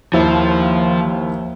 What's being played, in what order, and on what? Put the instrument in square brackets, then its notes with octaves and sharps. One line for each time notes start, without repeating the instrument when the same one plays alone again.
[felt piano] D#2 E4 C5 [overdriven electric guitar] F3